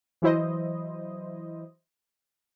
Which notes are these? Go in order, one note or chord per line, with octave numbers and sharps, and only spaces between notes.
E3 F#3 E4 C5 D#5